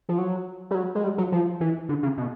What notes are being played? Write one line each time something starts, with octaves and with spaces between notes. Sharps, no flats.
F3
F#3
G3
F#3
G#3
G3
F#3
F3
E3
D3
C#3
B2